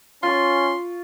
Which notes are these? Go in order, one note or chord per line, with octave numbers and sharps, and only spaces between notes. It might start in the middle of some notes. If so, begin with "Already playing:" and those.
C#4 F4 C6 C#6